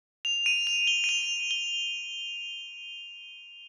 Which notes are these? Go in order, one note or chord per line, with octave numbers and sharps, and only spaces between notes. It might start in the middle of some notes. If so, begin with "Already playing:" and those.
F7
D#7
F7
G7
D#7
F7
G7